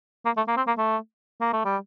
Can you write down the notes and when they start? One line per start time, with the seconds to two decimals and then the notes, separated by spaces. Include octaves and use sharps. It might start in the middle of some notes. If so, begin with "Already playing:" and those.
0.26 A#3
0.37 A3
0.48 A#3
0.57 C4
0.68 A#3
0.78 A3
1.41 A#3
1.53 A3
1.65 G3